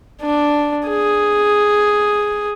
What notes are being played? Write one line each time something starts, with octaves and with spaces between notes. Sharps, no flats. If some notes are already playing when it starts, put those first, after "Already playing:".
D4
G#4